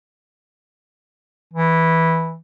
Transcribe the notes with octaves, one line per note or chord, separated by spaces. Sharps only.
E3